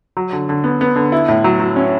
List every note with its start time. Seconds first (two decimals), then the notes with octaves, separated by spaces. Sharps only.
0.17 F#3
0.33 D3
0.49 D3
0.64 B3
0.81 B3
0.96 D3
1.12 E4
1.28 A2
1.44 F#3
1.60 F#3
1.76 C#4